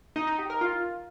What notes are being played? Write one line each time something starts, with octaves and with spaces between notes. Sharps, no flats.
D#4
D#4
G4
A#4
F4